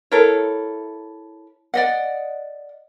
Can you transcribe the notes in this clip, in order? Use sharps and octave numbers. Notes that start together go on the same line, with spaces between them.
E4 A4 A#4 C#5
D5 D#5 F#5